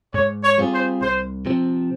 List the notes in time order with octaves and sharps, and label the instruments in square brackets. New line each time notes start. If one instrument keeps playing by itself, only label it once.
[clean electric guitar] G#2 [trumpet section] C#5
[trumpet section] C#5
[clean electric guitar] G3 C4 F4 G#4
[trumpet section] C5
[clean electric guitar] C2 [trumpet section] C5
[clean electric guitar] C3 F3 C4